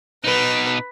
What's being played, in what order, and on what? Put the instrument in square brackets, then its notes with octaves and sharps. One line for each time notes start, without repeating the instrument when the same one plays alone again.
[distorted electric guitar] B2 D#4 [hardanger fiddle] B4